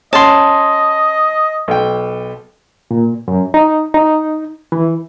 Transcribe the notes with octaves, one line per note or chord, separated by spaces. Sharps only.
C#4 D#5 A5 C6
B1 G5
A#2
F#2
D#4
D#4
E3